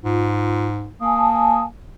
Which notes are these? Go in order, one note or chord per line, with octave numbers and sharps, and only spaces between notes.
G#2 F4
A#3 G#5 A5 D#6